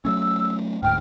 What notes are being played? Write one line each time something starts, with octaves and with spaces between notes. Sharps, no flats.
F#3 A3 C#4 E6
D1 D2 G#2 G5 F6